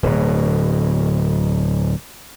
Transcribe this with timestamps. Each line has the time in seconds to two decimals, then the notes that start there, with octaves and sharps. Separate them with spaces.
0.03 D1 B2